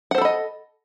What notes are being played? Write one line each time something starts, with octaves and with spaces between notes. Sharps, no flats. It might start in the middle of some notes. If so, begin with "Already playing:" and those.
A4 C5 D#5 F#5 B5